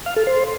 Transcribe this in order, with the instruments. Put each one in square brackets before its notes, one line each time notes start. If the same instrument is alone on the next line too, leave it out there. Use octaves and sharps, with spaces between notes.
[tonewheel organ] F5
A4
C5